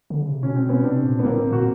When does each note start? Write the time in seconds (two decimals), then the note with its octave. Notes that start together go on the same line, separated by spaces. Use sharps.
0.10 D3
0.21 C#3
0.32 C3
0.42 B2 C#4
0.56 C4
0.69 B3 C#4
0.84 C3 C4 D4
1.05 A#2
1.19 B3
1.25 A#2 A#3 C4
1.39 A2
1.51 A#2 F#4